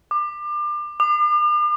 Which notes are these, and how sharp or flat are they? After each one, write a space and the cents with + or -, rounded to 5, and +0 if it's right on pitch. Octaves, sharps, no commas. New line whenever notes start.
D6 +30
D6 +45